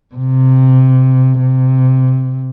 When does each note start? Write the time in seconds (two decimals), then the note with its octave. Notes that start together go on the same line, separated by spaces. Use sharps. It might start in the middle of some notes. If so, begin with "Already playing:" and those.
0.15 C3
1.40 C3